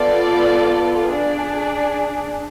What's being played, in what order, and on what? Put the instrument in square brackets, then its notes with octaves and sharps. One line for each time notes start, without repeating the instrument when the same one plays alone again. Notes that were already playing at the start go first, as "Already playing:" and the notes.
Already playing: [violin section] B3 F4 A4 D5
D4 G#4 D5